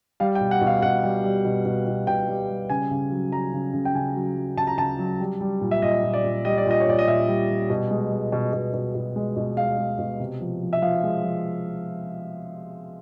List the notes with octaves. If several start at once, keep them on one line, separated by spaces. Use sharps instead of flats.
G3 F5
G5
B2
F#5
B2
F5
B2 F#5
G3
G3
B2
B2
B2
B2 G5
G3
G3
C#3 G#5
C#3
F#3
F#3 A#5
C#3
C#3
G5
C#3 G#5
F#3
F#3
C#3 A5
A#5
C#3 A5
F#3
G3
G3
A#2
E5
A#2 D#5
A#2
D5
A#2
G3 D#5
D5
A#2 D#5
C#5
A#2 D5
D#5
A#2 E5
G3
G3
B2
G#3
G#3
B2
B2
B2
B2
G#3
B2
G#3 F5
G#3
B2
C3
F3
F3
E5
F3 F5
G#3
F3